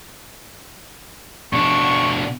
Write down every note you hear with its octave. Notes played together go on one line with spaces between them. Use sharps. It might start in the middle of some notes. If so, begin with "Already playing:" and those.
B2 D4 C#6